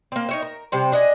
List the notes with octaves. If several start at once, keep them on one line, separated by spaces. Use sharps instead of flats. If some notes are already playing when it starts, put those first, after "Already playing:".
A#3 C4
D#4 C#5 E5
A#4
C3 G3 C5
D4 D#5 F#5 G#5